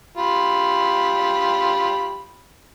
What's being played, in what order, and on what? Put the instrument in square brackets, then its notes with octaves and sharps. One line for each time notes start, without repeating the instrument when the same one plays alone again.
[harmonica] F4 G4 B5